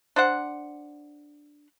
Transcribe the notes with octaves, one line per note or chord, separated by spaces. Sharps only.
D4 C5 F#5